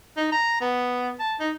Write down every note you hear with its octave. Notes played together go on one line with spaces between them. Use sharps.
D#4
A#5
B3
A5
D#4